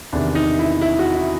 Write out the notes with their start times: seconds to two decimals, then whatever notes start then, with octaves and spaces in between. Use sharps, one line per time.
0.13 E2 C3 D#3 D4
0.35 D#4
0.59 E4
0.81 E4
0.99 F#4
1.15 E4